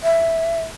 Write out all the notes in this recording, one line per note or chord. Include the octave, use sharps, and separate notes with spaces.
E5